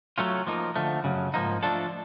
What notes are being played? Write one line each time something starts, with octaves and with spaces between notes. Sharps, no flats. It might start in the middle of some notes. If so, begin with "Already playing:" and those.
F#3 A3 C#4 F4
F3 A#3 D#4
D3 F3 A3
F#2 C#3 F#3
G#2 F3 A#3 D#4
F3 A3 D4 F4 A4